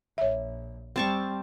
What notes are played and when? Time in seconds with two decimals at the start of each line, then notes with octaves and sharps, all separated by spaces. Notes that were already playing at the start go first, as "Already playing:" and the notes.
0.18 A#1 C#5 E5
0.96 G3 C4 A5 C#6